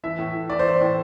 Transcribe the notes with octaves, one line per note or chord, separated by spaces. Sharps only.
E3 E5
A2
E3
E3 D5
C5
E3 D5
A2